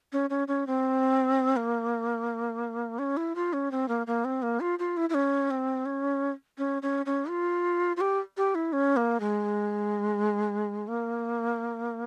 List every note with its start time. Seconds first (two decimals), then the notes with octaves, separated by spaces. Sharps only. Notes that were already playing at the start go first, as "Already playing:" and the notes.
0.12 C#4
0.30 C#4
0.48 C#4
0.67 C4
1.56 A#3
2.99 C#4
3.17 E4
3.35 F4
3.53 C#4
3.71 C4
3.88 A#3
4.07 A#3
4.25 C4
4.42 A#3
4.60 F4
4.79 F4
4.97 E4
5.10 E4
5.14 C#4
5.51 C4
5.86 C#4
6.58 C#4
6.82 C#4
7.06 C#4
7.29 F4
7.97 F4
8.01 G4
8.37 G4
8.55 E4
8.73 C#4
8.97 A#3
9.20 G#3
10.88 A#3